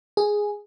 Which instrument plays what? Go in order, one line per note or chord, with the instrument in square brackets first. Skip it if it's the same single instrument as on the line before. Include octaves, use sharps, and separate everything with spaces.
[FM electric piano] G#4